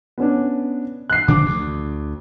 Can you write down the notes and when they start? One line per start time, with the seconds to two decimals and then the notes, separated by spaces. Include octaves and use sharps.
0.18 B3 C#4 D4
1.10 F#6 C7
1.28 D3 F3 D4 D6
1.46 D2